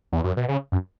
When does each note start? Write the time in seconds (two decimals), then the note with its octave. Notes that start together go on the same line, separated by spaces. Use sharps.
0.12 E2
0.24 F#2
0.37 B2
0.48 C#3
0.72 F#2